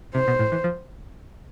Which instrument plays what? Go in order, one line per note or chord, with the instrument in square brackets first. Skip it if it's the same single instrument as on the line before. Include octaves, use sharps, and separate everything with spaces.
[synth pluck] C3 [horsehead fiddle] C5
[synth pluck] B2
A2
E3
F3